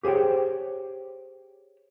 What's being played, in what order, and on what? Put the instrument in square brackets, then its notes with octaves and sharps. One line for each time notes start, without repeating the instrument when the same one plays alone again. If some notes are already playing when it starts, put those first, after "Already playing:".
[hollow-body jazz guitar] G4 G#4 C5 C#5 G5